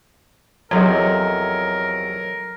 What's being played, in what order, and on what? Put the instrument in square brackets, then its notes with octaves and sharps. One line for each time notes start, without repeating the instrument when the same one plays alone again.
[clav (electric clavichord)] E2 C3 F3 [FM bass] F#3 [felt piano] A4 C#5 D#5 [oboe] A#4